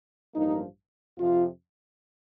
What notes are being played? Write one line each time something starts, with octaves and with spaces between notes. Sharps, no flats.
A1 G2 F3 A#3 D#4
F2 C3 F3 F4